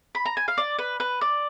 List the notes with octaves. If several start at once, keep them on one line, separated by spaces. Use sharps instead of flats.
B5
A#5
G#5
F5
D5
B4
B4
D5